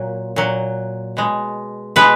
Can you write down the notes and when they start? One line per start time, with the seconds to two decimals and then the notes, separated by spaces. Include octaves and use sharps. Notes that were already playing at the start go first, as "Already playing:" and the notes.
Already playing: A#2 F#3
0.36 A#2 F#3
1.17 B2 G#3
1.96 B2 G#3 B4